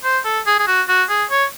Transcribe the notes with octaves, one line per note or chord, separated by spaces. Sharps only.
C5
A4
G#4
G#4
F#4
F#4
G#4
C#5